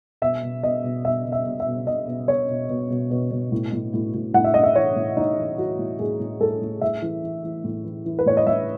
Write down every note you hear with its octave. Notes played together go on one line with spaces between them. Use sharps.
B2 E5
B2
B2 D#5
B2
B2 E5
B2
E5
B2
E5
B2
B2 D#5
B2
B2 C#5
B2
B2
B2
B2
B2
A2
A2
A2
A2
A2 F#5
E5
A2 D#5
E5
E3 C#5
A2
A2 D#4
E3
E3 F#4
A2
A2 G#4
A2
A2 A4
A2
A2 E5
E3
E3
E3
A2
E3
E3
B4
A2 C#5
D#5
A2 E5